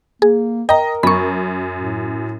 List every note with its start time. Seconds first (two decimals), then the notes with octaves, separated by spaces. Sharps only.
0.22 A#3 G#4
0.69 A#4 D#5 G5 A#5
1.03 F#2 B5 C#6
1.75 A2